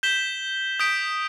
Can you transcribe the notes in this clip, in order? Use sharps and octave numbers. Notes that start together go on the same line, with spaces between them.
G6 B6 E7 G7
D#6 G6 B6 D7